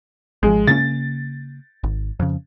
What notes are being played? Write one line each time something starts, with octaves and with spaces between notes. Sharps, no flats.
G#1 F3 G#3
C#3 A#3 C#4 A6
G#1
F2 C#3